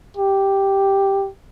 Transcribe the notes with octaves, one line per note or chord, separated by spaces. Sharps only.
G4